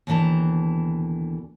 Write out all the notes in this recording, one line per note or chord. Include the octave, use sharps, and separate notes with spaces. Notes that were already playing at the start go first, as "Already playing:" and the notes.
D#2 B2 D3 E3 A5 A#5